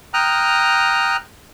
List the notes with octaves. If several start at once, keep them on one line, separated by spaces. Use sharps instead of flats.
G5 A#5 D#6 F6 F#6